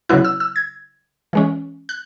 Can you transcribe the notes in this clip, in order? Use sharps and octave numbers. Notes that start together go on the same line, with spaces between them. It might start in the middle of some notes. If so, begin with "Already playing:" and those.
C#3 F#3 B3 E4 F#6
E6
E6
G#6
E3 G#3 C#4
F#6